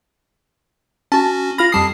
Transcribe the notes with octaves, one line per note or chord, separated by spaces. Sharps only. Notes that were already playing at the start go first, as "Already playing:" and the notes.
C#4 F#4 A5
F4 B5 F6 A#6
F2 G3 A5 D#6 C7